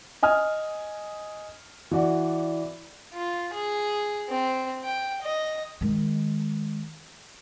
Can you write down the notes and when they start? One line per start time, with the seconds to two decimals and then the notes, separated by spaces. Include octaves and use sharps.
0.23 D#5 G#5 D#6 F6
1.91 E3 F#4 D5
3.13 F4
3.54 G#4
4.29 C4
4.84 G5
5.23 D#5
5.81 D#3 G#3